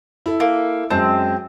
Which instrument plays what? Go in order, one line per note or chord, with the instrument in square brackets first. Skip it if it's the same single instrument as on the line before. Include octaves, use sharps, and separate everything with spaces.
[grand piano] E4 A4
[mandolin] A#3
[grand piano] F#2 G#3 A5 [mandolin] C4